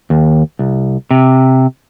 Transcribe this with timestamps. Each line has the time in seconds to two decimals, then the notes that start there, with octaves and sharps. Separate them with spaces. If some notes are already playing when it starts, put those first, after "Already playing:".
0.10 D#2
0.59 C2
1.11 C3